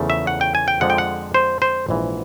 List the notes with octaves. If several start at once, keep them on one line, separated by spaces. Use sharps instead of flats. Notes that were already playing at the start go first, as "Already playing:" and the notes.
Already playing: E2 C#3 F3 A3
E5
F#5
G5
G#5
G5
F2 D3 F3 G#3 F#5
G5
F#5
C5
C5
A#1 G#2 E3